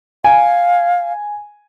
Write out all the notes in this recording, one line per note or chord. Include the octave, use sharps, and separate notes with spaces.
F5 G#5